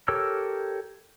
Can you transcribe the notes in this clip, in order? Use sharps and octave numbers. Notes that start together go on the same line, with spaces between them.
G4 A4 A#4 C#5 E6